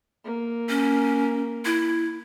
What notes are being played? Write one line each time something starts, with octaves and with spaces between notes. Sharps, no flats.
A#3
C#4
E4